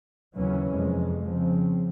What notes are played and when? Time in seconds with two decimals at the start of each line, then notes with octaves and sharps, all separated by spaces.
0.36 D#2 C#3 E3 F#3 C#4
0.73 F2 C3 G#3
1.22 C#3 F3 C4